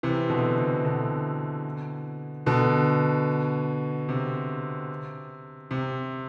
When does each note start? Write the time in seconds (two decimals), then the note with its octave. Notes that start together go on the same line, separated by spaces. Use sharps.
0.03 C3 E3
0.30 B2 D3
0.58 C3
0.84 B2 D3
2.46 B2 D3
4.09 C3
5.71 C3